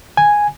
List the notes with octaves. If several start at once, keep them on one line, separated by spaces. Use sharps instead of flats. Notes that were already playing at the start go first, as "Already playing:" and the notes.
G#5